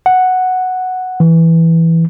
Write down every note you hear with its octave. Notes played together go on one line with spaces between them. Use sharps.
F#5
E3